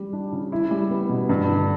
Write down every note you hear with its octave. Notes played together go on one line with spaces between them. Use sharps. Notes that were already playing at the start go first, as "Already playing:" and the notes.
Already playing: G3 G4
D4
C#3
E4
G3
B3
B2
G2
D3